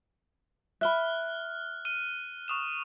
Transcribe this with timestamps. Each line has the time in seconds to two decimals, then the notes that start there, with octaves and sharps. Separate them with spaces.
0.81 E5 B5 F6 F#6
1.85 F6 D#7
2.48 C#6 D#6 E7